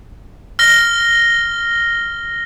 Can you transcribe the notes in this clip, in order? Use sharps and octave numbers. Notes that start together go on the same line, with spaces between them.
F6 A#6 G7